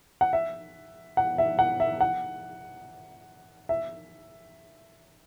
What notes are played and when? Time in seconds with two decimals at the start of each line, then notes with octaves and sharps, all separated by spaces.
0.21 F#5
0.33 E5
1.17 F#5
1.38 E5
1.59 F#5
1.80 E5
2.01 F#5
3.69 E5